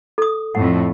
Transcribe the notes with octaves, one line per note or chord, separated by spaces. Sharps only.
A4 D#6
F2 A2 F#5